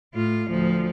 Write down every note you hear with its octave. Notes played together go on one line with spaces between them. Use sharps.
A2 F4
D2 F3